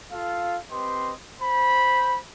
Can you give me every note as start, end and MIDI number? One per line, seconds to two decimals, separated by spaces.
0.12 0.57 65
0.12 0.57 69
0.12 0.57 77
0.71 1.12 60
0.71 1.12 67
0.71 1.12 71
0.71 1.12 75
0.71 1.12 84
1.40 2.21 72
1.40 2.21 83